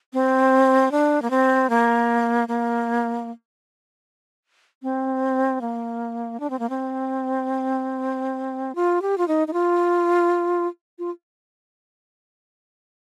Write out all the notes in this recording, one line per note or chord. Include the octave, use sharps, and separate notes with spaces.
C4
D4
A#3
C4
A#3
A#3
C4
A#3
D4
C4
A#3
C4
F4
G4
F4
D#4
D#4
F4
F4